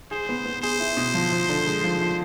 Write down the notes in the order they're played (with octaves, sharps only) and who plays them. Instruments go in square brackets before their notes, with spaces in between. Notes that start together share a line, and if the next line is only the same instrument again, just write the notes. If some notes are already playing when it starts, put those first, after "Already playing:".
[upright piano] G#4 [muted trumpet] C5
[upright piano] B3
B3
[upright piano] G#4 [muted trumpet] C5
[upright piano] E4
B2
F3
F3
D3
G#3
F3
F3